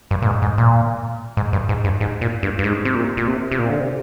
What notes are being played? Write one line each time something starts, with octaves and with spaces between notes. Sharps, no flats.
G2
A#2
G#2
G#2
A#2
G#2
G2
G#2
G2
G#2
A#2
G2
G2
G#2
C3
A#2
A#2
C3
C3
A#2
D3
C3